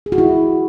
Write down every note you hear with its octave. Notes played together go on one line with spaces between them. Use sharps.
G#4
F#4
E4